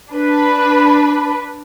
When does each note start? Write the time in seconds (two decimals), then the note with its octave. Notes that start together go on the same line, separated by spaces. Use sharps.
0.11 D4 B4